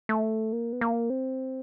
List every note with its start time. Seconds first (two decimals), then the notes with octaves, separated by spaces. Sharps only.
0.09 A3
0.52 A#3
0.73 B3
0.81 A#3
1.10 C4